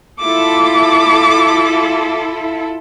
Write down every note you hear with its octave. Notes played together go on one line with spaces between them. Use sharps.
E4 F4 A4 D6